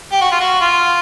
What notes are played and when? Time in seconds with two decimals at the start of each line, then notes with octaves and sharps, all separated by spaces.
0.12 G4
0.21 F#4
0.32 F4
0.40 F#4
0.61 F4